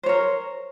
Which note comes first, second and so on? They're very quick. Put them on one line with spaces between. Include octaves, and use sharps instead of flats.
C5 C#5 A#4